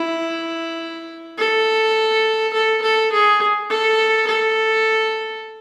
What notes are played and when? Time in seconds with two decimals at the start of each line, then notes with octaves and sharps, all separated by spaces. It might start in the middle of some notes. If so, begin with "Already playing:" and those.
Already playing: E4
1.38 A4
2.53 A4
2.82 A4
3.12 G#4
3.70 A4
4.27 A4